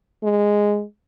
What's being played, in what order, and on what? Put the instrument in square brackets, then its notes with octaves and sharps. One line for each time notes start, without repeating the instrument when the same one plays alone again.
[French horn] G#3